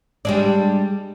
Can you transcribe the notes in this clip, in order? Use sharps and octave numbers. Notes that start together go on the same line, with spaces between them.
G3 G#3 D4